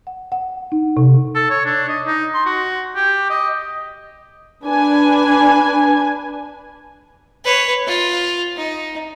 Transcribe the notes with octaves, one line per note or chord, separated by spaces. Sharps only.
F#5
F#5
D#4
C3
A4
C#5
D4
D#5
D#4
C6
F#4
G4
D#5
D4 B4 G#5
B4 C#5
F4
D#4